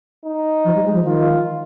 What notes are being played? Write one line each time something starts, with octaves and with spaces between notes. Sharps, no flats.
D#4
F3
G3
G#3
F3
D#3 F4